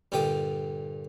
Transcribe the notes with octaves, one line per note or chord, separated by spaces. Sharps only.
G2 A#2 D3 G4 G5 D#6